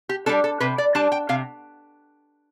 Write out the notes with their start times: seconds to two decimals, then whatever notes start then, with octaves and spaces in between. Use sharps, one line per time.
0.09 G4
0.26 G3 D4 A4
0.44 A4
0.60 C3 B4
0.78 D5
0.95 G3 D4 A5
1.12 G5
1.29 C3 F5